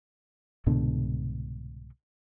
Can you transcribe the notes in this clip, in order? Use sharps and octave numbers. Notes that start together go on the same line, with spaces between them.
C2 G#2 B2 D3